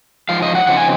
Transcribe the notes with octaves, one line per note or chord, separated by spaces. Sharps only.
G#2 F3 F5
D#5
F#5
C#3 F3 C4 D#4 F#5
G#5